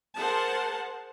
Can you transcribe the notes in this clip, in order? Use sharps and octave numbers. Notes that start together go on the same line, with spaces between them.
G#4 A#4 C5 F#5 A5